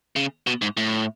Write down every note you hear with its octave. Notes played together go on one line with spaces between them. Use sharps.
C#3
B2
G#2
A2